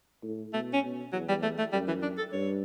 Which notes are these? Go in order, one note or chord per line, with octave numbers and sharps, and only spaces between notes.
A2
B2 A3
C#4
B2
E2 F#3
G3
A3
A3
F#2 G3
E3
D4
A4
G2 C#5